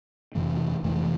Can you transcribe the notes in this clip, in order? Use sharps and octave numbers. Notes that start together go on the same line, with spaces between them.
F2 C3 E3 A3
F2 C3 E3 A3